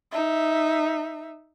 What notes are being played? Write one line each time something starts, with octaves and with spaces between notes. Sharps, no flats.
D#4 E5